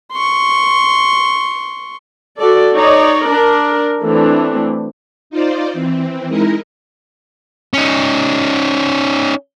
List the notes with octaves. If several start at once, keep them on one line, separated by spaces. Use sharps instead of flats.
C6 C#6
F#4 A4 D5
D#4 C#5 D5
D4 A#4
E3 A3 C4 D4
D#4 F4 C5 D5
E3 C4
G#3 D#4 E4 A#4 D#5
C#4 D#4